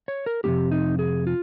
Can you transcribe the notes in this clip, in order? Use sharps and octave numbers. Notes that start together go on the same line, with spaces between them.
C#5
A#4
F2 C3 F3 C4 G4
D#4
G#4
F4